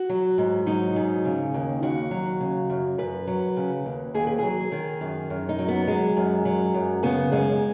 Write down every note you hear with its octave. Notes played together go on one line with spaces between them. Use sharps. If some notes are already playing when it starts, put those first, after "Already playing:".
Already playing: F#4
F#3
G#2
F#3 D#4
G#2
C#3
D#2
D#2 F#4
F#3
C#3
F#2
F#2 B4
F#3
C#3
D#2
D#2 G#4
B4
F#3 G#4
D#3
F#2
F#2
D#4
F#3
B3
F#3 G#3
F#2
F#3
F#2
C#3 B3
F#2 G#3